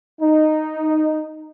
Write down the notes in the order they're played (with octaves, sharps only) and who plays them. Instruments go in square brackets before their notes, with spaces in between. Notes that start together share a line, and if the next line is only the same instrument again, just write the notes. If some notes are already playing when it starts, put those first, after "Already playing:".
[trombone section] D#4